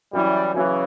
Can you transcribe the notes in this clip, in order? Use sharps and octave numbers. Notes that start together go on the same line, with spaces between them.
E3 F#3 G3 C#4 E4
C#3 E3 F#3 C#4 E4